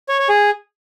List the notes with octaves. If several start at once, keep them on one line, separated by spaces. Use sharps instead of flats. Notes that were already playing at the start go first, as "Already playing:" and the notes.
C#5
C#5
G#4